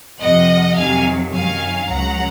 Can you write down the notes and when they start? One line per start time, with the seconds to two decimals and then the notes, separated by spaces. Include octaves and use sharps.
0.20 F2 C3 F3 D#5 F#5
0.76 F2 C3 D#3 F#3 F5 G#5
1.32 F#2 D#3 F#3 F5 G#5
1.89 C#2 C#3 F#3 F#5 A#5